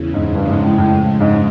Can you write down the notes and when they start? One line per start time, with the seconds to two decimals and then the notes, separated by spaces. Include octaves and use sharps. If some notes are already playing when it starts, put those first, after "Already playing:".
Already playing: E2 C#3 E3
0.14 G#2
0.35 G2 C#3 F3 G#3
0.49 G#2
0.63 A2
0.78 A2
1.21 G#2